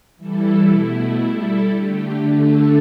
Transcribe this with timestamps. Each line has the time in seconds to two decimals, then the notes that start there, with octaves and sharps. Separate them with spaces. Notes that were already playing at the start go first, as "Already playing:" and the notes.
0.17 E3 G3 E4 A4
0.66 B2 A3 E4
1.16 G3 E4 A4
1.67 D3 A3 G4
2.17 D3 A3 D4 A4